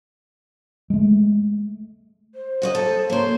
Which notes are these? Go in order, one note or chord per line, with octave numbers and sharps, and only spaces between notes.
G#3 A3
C5
F#4 C#5 D#5
A4
A#3 C5 C#5